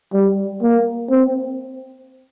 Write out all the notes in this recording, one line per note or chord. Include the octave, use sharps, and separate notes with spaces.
G3
A#3
C4